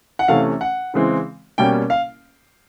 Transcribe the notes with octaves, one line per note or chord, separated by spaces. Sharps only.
F#5
C3 E3 A3 C#4 F5
F#5
C#3 E3 G#3 C4
B2 G3 A#3 C#4 G5
F5